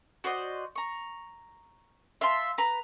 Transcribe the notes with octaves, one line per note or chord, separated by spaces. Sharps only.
F#4 C5 D5 D#5
A#5 C#6
E5 F5 A5 C6
B4 A#5